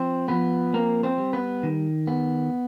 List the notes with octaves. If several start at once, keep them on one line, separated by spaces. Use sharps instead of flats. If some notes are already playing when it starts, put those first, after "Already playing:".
Already playing: F3 C4 C5
F3 B3 B4
A#3 C4 A#4
C4 C5
G3
B3 B4
D#3
B3